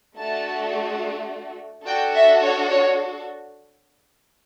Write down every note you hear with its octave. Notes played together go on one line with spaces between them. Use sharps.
A3 D4 F#4 A4 A5
D4 F#4 A4 G5
E5
C#5
C#5